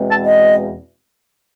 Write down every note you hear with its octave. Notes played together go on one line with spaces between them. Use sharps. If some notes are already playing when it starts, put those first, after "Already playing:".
Already playing: E2 B2 G#3 C4
A5
D#5